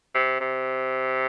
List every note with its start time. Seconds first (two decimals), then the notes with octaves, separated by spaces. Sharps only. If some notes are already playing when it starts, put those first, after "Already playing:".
0.14 C3
0.40 C3